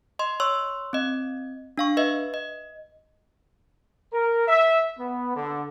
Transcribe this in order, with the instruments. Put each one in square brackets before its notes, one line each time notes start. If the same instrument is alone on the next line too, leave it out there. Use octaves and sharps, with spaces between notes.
[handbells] D#5 C6
C#5 C6 C#6 E6
C4 D#5
D4 F5 C#6
B4 D#5 E5
D#5
[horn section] A#4
E5
B3
D3